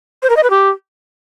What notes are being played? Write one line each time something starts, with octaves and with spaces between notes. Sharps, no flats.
C5
A#4
D#5
B4
G4